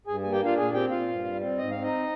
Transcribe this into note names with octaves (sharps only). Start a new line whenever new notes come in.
G2 G#4 G#5
A#3 G#5
G4 G5
D4 F4 F5
A#2 G#4 G#5
C4 G4 G5
A#2 F4 F5
G2
G3
C4
G#2 D#5
C4 F5
D#4 D#5